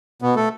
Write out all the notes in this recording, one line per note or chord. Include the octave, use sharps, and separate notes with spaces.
B2 B3
A3 A4